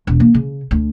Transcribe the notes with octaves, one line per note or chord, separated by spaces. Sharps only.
E1
A#3
C#3
D2